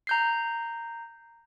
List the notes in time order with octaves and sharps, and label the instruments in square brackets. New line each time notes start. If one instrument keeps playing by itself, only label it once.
[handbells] A#5 G6 C7